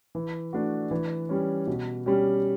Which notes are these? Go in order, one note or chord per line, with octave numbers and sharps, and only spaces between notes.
E3
A3 D4 F#4
E3
G3 C#4
B2
G3 C#4 G4